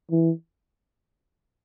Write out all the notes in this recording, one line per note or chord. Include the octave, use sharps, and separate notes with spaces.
E3